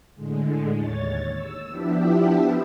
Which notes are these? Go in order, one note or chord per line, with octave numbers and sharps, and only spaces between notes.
A2 D3 G#3
D#2 C#5 A6
E6
F3 B3 D4 E4 G4 E5